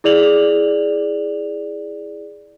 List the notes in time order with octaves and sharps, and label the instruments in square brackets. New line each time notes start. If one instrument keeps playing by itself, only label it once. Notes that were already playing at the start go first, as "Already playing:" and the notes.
[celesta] E4 G#4 D5 F7 F#7